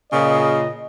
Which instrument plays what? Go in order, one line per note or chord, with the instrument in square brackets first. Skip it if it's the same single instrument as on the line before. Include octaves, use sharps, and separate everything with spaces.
[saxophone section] A#2 C#3 [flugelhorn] D#5